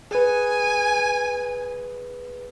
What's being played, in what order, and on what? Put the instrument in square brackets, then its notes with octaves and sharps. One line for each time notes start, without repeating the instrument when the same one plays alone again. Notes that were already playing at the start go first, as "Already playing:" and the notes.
[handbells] G#4 B4 [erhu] G#5